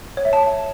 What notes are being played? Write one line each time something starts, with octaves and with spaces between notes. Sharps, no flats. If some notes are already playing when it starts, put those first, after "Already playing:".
C#5
E5
A5